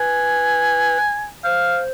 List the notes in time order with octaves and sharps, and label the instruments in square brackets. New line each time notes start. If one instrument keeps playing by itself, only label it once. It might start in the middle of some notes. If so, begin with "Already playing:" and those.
Already playing: [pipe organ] B4 [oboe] G#5
[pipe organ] C5 [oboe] F5